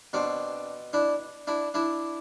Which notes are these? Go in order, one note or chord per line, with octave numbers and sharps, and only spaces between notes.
B2 C4 D4
D4 E4
D4 E4
D4 E4